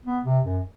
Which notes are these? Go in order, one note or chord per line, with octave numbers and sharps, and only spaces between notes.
B3
C3
F#2